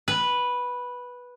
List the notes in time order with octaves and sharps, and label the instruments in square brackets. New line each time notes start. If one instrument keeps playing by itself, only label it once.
[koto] B4